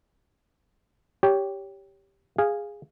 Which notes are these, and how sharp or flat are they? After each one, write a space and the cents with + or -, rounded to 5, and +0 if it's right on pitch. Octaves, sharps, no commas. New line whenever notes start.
G4 +0 C#5 +15
G#4 -10 F5 +0